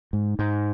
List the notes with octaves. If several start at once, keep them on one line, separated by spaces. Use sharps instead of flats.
G#2
G#2